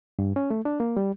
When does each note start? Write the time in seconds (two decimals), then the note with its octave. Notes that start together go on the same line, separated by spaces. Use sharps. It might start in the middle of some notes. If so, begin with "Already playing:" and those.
0.19 G2
0.36 C#4
0.50 A3
0.65 D4
0.80 A#3
0.97 G3